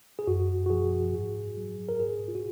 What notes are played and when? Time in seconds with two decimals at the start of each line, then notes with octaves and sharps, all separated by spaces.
0.19 G#4
0.27 F#2 F#4
0.66 F#4
0.70 F3 G#4
1.14 G#2
1.57 F#3
1.89 A#4
2.00 G#2 G#4
2.28 F4
2.35 F#4